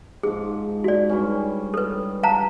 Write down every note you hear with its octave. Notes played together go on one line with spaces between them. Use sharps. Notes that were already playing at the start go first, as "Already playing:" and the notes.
G#2 F3 G#4
F#4 D5
G2 G3 C#4
A4 B4
F5 A5 A#5